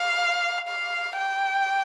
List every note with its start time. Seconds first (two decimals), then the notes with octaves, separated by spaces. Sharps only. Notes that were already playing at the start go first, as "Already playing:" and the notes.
Already playing: F5
0.68 F5
1.18 G5